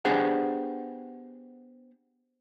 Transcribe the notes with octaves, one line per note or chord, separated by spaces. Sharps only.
B3 D4 G4 G#4 C5 F#5